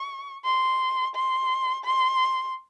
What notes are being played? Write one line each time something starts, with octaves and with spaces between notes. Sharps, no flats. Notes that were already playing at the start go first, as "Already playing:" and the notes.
Already playing: C#6
C6
C6
C6